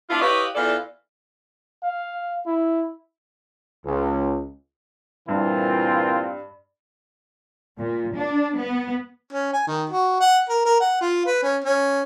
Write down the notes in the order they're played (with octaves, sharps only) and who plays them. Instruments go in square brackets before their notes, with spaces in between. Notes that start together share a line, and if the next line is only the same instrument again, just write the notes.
[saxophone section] B3 D4 E4 F4
E4 G4 B4 C#5 D#5 F5
E2 E3 F4 A4 D5
[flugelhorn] F5
E4
[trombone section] C#2
[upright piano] G2 [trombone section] A#2 E3 [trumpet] C4 [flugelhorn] F4
[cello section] A#2
D4
B3
[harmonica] C#4
G#5
D#3
F#4
F#5
A#4
A#4
F#5
F4
B4
C#4
C#4